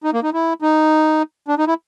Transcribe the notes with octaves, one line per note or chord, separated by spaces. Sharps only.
D#4
A#3
D#4
E4
D#4
D4
D#4
E4